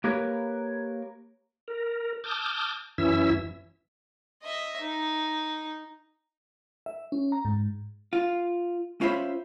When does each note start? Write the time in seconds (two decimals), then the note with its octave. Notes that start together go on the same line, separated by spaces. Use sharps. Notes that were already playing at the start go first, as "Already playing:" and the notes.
0.04 A#3 G4 A#4 B4 C#5
1.68 A#4
2.24 A5 D6 D#6 F6 G6
2.98 F#2 E3 C#4 E4 E5 E6
4.43 D#5 E5
4.81 D#4
6.86 E5
7.12 C#4
7.32 A#5
7.45 G#2
8.13 F4
9.01 C#4 F4 C5 E5 B5